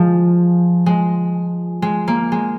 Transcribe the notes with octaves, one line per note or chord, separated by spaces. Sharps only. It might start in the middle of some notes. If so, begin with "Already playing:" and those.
Already playing: F3 G#3
G#3
G#3
A#3
G#3